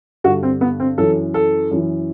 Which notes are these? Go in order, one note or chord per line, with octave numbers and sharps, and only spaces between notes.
G2 D3 F#4
C4
B3
C4
F#2 E3 A4
A4
F#2 E3